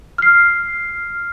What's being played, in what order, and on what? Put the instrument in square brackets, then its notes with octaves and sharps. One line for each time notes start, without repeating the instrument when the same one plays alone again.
[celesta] F6 C7